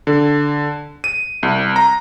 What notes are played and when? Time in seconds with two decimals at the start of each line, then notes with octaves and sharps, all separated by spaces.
0.07 D3
1.04 D#7
1.43 C2
1.76 A#5